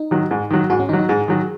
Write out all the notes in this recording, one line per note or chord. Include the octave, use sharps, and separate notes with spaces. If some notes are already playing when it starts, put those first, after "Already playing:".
Already playing: D#4
D#3 F#3
G#2
D#3 F#3
G#2 F#4
C#4
D#3 F#3 D#4
D#4
G#2 G#4
D#3 F#3